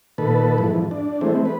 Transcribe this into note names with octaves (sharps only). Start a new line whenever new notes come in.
A#2 D#3 A4 B4
F2 G#2 E3
D4
E3 G#3 A3 C4
B4